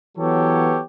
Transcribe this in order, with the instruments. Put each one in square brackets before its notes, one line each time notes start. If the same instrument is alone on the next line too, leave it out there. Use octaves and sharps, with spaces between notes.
[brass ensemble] E3 F#3 B3 G4 A4 C#5